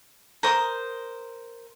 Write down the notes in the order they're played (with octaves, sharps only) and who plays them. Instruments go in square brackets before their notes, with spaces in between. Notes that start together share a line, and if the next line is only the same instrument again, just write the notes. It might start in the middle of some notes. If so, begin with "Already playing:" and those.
[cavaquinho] A#4 C5 D#6